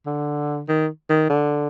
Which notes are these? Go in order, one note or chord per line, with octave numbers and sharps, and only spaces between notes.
D3
D#3
D#3
D3